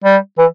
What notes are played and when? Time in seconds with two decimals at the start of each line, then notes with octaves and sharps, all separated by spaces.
0.04 G3
0.38 E3